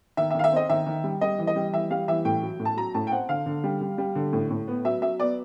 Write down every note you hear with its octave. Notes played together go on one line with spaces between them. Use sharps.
D#3 E5
E5
D#3 F5
E5
C4 D#5
D#3 E5
D#3
G3
G3 D#5
E3
D#5
G3
E3 E5
G3 F5
E3 E5
A2 G5
F#3
A2
A5
F#3 A#5
A2 A5
G5
C4 F#5
D3 F5
D3
G3
G3
G3
D3
A2
A2
B3
F#3 E5
F#3 E5
B3 D5